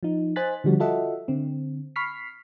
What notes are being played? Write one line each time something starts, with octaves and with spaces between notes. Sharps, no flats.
F3 D#4
C5 D#5 G#5 F#6 A6 B6
D3 F3 G3 F#4
F4 F#4 A4 D#5 E5 F#5
D3 C4
B5 C#6 F6 B6 C7